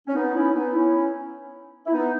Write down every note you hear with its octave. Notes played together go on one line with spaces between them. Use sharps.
C#4
B3 D#4
C#4 E4
B3 D#4
C#4 E4
E4
B3 D#4